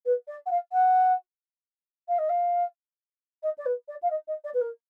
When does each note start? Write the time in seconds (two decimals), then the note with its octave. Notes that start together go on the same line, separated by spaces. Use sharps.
0.05 B4
0.27 D5
0.46 F#5
0.51 F5
0.72 F#5
2.08 F5
2.18 D#5
2.29 F5
3.43 D#5
3.58 D5
3.66 B4
3.88 D5
4.02 F5
4.10 D#5
4.27 D#5
4.44 D5
4.54 B4
4.61 A#4